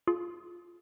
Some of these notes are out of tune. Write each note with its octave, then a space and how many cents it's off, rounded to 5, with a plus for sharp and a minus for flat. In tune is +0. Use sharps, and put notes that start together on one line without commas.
F4 +0 G#4 +35